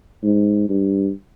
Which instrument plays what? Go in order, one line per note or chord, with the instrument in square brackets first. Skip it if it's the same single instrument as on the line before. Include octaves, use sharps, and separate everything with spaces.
[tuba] G#2
G2